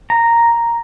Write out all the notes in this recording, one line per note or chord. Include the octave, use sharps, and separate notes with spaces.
A#5